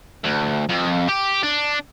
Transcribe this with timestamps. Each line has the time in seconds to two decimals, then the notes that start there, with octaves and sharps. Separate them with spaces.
0.24 D2
0.69 F2
1.09 G4
1.43 D4